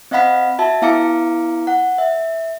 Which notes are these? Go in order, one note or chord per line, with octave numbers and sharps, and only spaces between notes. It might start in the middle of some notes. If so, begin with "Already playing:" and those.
C4 D#5 F5 F#5 B5 B6
F#4 E5 A5
B3 E4 F5 A#5 D6 C#7
F#5
E5